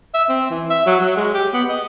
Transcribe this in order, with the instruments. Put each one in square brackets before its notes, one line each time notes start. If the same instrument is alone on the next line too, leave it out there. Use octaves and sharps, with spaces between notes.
[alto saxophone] E5
C4
E3
E5
F#3
F#3
G#3
G4
B3
D#5